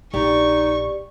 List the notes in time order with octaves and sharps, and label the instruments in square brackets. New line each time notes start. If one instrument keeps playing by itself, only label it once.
[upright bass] A#1 [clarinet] D#4 [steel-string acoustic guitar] G4 D5 [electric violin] C#6